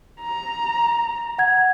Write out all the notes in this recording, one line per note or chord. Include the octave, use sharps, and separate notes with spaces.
A#5
F#5 G#6